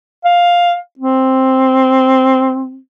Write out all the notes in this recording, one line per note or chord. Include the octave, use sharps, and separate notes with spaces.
F5
C4